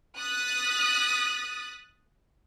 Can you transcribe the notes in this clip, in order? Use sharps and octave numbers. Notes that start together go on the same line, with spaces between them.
D#6 F#6 A6 B6